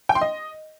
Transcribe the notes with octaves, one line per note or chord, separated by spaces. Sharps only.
G5
C6
D#5